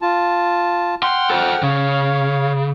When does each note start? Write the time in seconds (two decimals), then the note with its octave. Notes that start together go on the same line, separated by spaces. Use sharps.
0.02 F4 A5
1.03 F#5 G5 C6 F6
1.30 A4 C5
1.63 C#3 C#5 F5